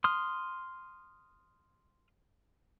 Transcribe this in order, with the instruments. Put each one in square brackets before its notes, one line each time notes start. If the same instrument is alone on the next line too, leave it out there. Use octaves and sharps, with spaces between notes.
[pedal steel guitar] C6 D#6 F6